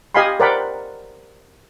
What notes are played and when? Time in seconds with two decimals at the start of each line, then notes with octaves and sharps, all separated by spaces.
0.14 G4 D#5 F5 G#5 B5 C6
0.40 A#4 C5 D5 F#5 G5 B5